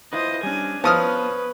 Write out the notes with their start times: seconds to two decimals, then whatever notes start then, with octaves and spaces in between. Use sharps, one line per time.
0.13 E4 F4 B4 C5 D#5
0.43 G3 C#4 D4 G#5
0.84 F3 B3 B4 C#5 D#6 F6